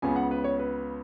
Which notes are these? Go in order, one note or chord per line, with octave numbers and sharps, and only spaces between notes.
C#2 C#3 B3 G#5
F#5
B4
C#5
B4